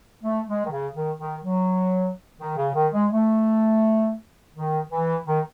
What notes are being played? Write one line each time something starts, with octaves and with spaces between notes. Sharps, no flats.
A3
G#3
D#3
C#3
D#3
D#3
F#3
D#3
C#3
D#3
G#3
A3
D#3
E3
D#3